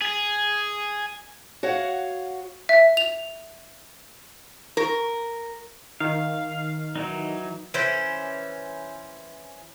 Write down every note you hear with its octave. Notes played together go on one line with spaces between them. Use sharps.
G#4
F#4 C#5 F5 F#5
E5
F7
A#4
D#3 F5
E3 F#3 D#4
E3 C#4 C5